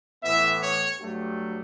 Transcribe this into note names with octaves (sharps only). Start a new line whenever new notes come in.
A2 E3 B3 E5
C#5
G2 F#3 A3